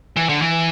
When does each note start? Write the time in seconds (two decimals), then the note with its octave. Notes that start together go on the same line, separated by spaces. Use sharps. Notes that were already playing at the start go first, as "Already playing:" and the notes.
0.16 E3
0.29 D3
0.42 E3